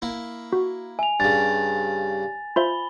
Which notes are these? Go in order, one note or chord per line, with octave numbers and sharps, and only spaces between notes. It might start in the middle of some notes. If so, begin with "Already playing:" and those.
A#3 E4
F#4
E5 G#5 F7
G2 C#3 A6
F4 C5 E5 B5 G7